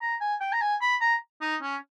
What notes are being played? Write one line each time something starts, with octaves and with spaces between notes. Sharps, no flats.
A#5
G#5
G5
A#5
G#5
B5
A#5
D#4
C#4